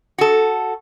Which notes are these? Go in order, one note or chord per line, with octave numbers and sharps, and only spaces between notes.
F#4 A4